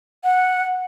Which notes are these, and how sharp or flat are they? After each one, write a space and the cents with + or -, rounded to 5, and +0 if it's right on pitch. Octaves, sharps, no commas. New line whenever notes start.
F#5 -10